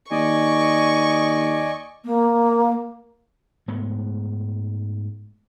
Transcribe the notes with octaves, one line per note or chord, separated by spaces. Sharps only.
D#2 D5 D#5 G#5 C#6
A#3
G#2 G#3 A3 B3